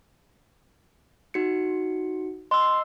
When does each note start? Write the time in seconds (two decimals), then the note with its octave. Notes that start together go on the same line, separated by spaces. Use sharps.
1.34 D#4 F#4 C#7
2.51 D#5 C6 E6